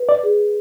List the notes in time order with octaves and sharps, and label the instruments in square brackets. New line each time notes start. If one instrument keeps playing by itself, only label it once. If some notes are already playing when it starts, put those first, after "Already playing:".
Already playing: [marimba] B4
[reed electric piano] D5
[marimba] G#4